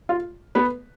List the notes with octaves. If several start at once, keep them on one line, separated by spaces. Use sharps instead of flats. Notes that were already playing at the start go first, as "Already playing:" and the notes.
F4
B3 B4